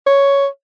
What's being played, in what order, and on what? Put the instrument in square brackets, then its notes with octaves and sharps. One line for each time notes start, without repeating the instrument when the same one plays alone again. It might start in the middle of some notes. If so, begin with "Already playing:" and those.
[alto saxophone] C#5